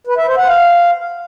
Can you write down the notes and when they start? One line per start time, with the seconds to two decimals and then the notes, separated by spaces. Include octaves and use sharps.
0.07 B4
0.17 E5
0.27 C5
0.37 F#5
0.48 F5